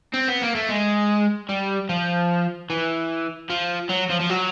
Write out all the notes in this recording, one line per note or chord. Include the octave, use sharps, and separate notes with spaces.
C4
B3
A#3
A3
G#3
G3
F3
E3
F3
F#3
F3
F3
F#3